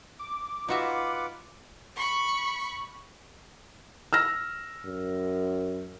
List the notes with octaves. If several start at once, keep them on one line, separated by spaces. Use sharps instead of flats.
D6
D#4 F4 F#4 B4 E5 F#5
B5 C#6
E6 F6 A#6
F#2